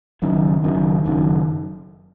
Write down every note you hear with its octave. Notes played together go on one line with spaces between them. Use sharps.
F#1 F#2 D#3
F#1 F#2 D#3
F#1 F#2 D#3